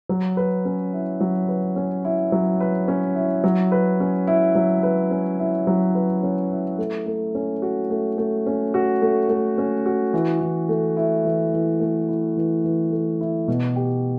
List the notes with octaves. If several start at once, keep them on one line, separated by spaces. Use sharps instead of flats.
F#3
B4
C#4
E4
F#3
B4
C#4
E4
F#3
B4
C#4
E4
F#3
B4
C#4
E4
F#3
B4
C#4
E4
F#3
B4
C#4
E4
A3
A3
C#4
F#4
A3
A3
C#4
F#4
A3
A3
C#4
F#4
E3
E3
A3
E4
E3
E3
A3
E4
E3
E3
A3
E4
B2
G4